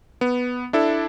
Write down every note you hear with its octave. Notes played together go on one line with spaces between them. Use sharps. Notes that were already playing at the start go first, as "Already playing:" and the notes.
B3
D4 E4 A4